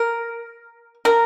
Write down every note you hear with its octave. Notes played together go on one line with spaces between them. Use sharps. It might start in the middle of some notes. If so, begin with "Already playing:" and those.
Already playing: A#4
A#4